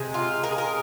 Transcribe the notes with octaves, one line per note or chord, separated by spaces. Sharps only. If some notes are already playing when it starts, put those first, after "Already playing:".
Already playing: C3 G#3
F4
A#4
G#4
A#4